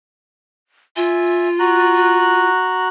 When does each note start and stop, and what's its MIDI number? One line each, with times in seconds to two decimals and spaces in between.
0.96 2.48 65
0.96 1.48 76
0.96 1.48 80
1.59 2.88 66
1.59 2.88 82
1.59 2.88 90